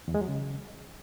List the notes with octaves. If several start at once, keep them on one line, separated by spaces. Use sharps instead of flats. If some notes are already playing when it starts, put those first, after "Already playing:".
E2
G#3
F#3
C#3